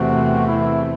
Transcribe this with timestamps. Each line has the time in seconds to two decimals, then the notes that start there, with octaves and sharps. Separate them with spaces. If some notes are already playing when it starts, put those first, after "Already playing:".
Already playing: E2 C3 E3 A3 C4 F#4
0.47 E4